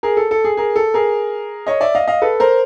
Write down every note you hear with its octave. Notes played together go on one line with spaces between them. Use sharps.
G#4 A#4
A4
A4
G#4
G#4 A#4
A4
G#4 A#4
C#5 D#5
D5 E5
D#5 F5
D#5 F5
A4 B4
A#4 C5